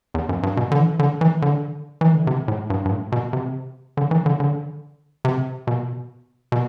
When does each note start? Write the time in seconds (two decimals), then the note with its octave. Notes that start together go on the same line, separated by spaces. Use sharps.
0.14 E2
0.29 F#2
0.43 G2
0.57 B2
0.72 D3
0.79 E3
0.99 D3
1.21 E3
1.42 D3
2.01 E3
2.14 D3
2.27 C3
2.48 A2
2.70 G2
2.85 G2
2.91 A2
3.12 B2
3.33 C3
3.97 D3
4.11 E3
4.26 D3
4.40 D3
5.25 C3
5.67 B2
6.52 B2